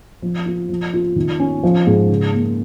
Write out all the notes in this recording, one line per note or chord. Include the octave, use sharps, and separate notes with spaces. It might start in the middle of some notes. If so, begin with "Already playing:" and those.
F3
F4
F3
F4
D#3
C#4
F3
G#2
C#3
A#3